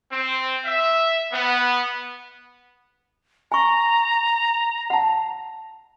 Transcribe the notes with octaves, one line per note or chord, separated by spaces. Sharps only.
C4
E5
B3
G#5 A#5 C#6
F#5 A5